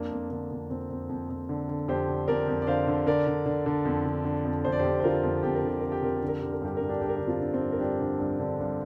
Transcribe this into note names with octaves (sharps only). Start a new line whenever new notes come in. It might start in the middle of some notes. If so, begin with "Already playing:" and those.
Already playing: F2 A#3 D4
F2
D3 A#3
F2
F2 C4
F2
F2
F2
D3
D3
F2 G4 C5
D3
F2 A#4 D5
F2
D5
D3 C5 F5
D3
D3 A#4 D5
D3
D3
D3
F2
D3
D3
F2
F2 C5
D5
F2 G4 C5
C5
D3 F4 A#4
F2
F2 G4
A#4
D3 G4
D3 A#4
G4
F2 A#4
G4
D3
A#4
D3 G4
A#4
G2 G4
G2 A#4
D4 G4
G2 G4
A#4
D3 D4 G4
C4 F4
D3
C4
G2
A#4
G2 D4 G4
D3
G2
D3
G2